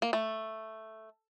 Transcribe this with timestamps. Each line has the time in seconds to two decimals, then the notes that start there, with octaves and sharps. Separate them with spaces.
0.02 A#3
0.13 A3